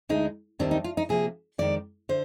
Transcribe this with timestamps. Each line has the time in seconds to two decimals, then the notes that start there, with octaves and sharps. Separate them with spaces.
0.09 D2 D3 G#3 D#4
0.59 D#2 D#3 G3 C4 D4
0.71 D#4
0.84 F4
0.97 D#4
1.09 C3 F3 A#3 G#4
1.58 F2 D#3 G#3 D5
2.09 D3 C5